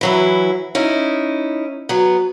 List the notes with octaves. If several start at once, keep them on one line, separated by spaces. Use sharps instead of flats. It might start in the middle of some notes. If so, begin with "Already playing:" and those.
E3 F#3 E4
C#4 D#4 E4
F#3 B3